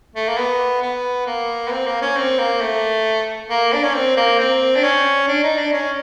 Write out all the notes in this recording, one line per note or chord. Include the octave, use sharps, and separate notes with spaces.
A3
A#3
B3
B3
A#3
B3
C4
A#3
C#4
C4
A#3
A3
A#3
D4
C#4
C4
A#3
C4
D4
C#4
D4
D#4
D4
C#4